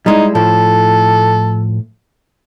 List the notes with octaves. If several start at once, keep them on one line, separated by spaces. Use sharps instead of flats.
G3 G#3 D#4 E4
A2 F3 E4 A4